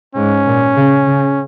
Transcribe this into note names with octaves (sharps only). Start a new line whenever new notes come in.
G#2 C#4
A#2
C#3
C#3